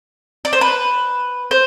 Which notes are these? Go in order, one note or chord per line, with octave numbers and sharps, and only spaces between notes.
D5
C5
B4
C5